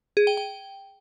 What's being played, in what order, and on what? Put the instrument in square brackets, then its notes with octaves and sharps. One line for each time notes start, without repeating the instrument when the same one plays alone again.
[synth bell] G#4
G5
G5